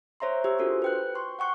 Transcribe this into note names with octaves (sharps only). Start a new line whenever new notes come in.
C5 C#5 E5 A#5 C6
G4 C6 E6
D4 F4 F#4 A4 A#4 C5
B4 G5 F#6
G5 C6 C#6
F#5 G5 C#6 F#6